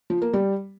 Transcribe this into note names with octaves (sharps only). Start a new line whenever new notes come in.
F3
A#3
G3